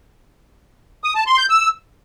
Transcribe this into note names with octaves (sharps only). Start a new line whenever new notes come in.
D#6
A5
C6
G6
E6